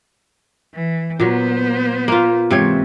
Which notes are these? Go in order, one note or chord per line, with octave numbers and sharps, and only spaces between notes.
E3
A#2 F#3 B3 C5
A#3 F4
G#2 C3 E3 C4 C#5